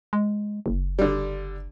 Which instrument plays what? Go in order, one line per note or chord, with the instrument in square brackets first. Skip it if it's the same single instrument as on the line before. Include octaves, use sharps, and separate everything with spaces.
[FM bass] G#3
F#1
[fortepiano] D3 G3